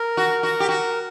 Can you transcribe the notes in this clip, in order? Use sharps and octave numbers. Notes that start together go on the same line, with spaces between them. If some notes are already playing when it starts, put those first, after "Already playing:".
Already playing: A#4
F#4
F#4
G4
F#4